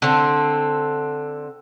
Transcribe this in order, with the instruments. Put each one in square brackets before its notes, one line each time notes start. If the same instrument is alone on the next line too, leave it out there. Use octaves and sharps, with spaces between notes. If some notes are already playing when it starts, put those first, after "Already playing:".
[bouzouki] D3 C4